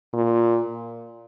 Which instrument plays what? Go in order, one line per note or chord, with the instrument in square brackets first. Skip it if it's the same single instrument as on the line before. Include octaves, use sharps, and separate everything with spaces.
[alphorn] A#2